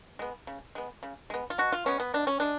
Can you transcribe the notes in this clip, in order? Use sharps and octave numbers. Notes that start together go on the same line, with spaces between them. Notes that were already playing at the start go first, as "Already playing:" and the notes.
G#3 B3
C#3
G#3 B3
C#3
G#3 B3
F4
B2 F#4
F4
G#3 B3 C#4
B3
B2 D4
C#4
G#3 D4